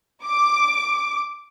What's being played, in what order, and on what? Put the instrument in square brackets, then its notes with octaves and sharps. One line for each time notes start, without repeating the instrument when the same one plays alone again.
[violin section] D6